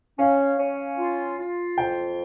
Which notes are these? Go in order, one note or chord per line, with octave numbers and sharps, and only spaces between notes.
C#4 F5
C#4
F4
F4
F2 G5